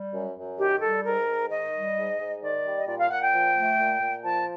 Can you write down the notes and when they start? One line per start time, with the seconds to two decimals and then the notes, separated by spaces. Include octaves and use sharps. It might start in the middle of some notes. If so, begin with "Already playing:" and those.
Already playing: G3
0.14 F#2
0.37 F#2
0.59 D#3 G4
0.82 G3 A4
1.05 G#2 A#4
1.28 G#2
1.50 D#3 D#5
1.73 G3
1.97 G#2
2.19 G#2
2.42 D#3 D5
2.65 G3
2.78 D#5
2.88 A#2 D5
2.99 F5
3.10 A#2 F#5
3.22 G5
3.33 F3
3.55 A3
3.79 A#2
4.01 A#2
4.24 F3 A5